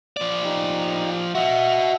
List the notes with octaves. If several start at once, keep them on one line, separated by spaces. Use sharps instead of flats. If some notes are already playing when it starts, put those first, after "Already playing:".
F3 D5
D#4 G4
F#4 D#5 E5 F#5